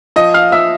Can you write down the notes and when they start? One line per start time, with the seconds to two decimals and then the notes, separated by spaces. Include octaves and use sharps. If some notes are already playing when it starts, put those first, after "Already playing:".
0.16 F3 D#5 D#6
0.34 F5 F6
0.52 F3 E5 E6